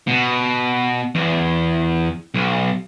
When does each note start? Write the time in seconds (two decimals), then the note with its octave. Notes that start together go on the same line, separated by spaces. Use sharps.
0.07 B2
1.15 E2
2.34 B1